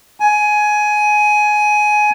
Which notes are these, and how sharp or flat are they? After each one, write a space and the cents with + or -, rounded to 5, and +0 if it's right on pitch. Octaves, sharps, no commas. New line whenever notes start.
G#5 +15